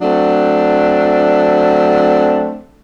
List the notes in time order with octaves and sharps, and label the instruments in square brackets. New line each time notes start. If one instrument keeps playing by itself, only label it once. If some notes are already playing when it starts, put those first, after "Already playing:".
[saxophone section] F#3 A3 C4 D4